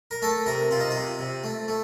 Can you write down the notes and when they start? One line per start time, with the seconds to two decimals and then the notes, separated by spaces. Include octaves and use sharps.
0.11 A#4
0.22 A3 A4
0.46 C3 A#4
0.70 C3 F4
0.80 D#4
0.91 C3 F4
1.19 C3
1.44 A3
1.68 A3